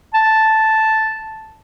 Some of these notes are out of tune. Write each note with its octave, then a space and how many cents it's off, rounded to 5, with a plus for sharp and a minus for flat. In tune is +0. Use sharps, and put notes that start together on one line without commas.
A5 +0